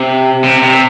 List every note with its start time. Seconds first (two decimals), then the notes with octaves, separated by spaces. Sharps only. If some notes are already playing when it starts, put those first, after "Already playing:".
Already playing: C3
0.44 C3
0.63 C3